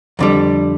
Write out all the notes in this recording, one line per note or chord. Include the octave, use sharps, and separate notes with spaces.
F2 D3 G3